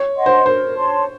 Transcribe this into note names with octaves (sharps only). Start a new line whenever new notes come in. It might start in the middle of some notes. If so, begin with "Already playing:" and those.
Already playing: C#5
D#5 F#5 C6
C5
A#4 C5
C#5 A5 C6